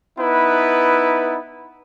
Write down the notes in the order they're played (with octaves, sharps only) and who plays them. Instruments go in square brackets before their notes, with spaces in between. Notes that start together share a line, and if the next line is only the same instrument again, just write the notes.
[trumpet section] B3 D#4 E4 B4